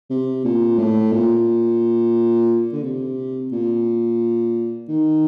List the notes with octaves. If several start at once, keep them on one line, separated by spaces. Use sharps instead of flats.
C3
A#2
A2
A#2
D3
C3
A#2
D#3